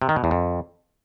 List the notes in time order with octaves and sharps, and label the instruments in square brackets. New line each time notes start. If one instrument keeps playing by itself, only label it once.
[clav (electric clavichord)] C3
D#3
B2
E2
F2